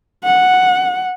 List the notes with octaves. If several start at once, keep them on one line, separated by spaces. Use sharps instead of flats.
F#5